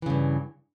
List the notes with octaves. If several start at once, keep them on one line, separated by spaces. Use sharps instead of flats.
G2 C#3 E3